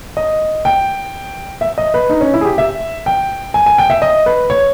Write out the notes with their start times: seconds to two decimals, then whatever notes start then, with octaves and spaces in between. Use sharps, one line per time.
0.17 D#5
0.65 G5
1.61 E5
1.78 D#5
1.94 B4
2.10 D#4
2.21 C#4
2.34 E4
2.41 G#4
2.45 G4
2.58 E5
3.06 G5
3.54 G#5
3.66 G#5
3.78 G5
3.90 E5
4.02 D#5
4.26 B4
4.50 C#5